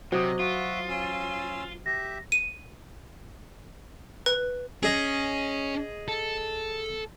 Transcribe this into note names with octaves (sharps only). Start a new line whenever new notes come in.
C3 F#3 C5 D#5 D6 D#6
F4 F#4 E5
C#4 C6 E6
G4 E5 A#6
D#7
B4
C#4 G#4 D#5
A4